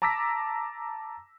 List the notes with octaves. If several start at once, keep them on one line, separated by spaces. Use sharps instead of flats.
A5 A#5 D6 E6 A#6 B6